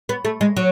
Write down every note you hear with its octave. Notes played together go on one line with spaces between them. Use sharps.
B3
A3
G#3
F#3